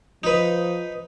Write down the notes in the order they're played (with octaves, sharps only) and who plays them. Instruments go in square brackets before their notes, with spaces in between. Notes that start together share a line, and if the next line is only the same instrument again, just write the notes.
[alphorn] F3 [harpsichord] D#4 B4